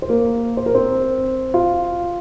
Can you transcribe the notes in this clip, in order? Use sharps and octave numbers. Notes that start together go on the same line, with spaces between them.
C5
A#3 A#4
C5
A#4
C4 C5
F4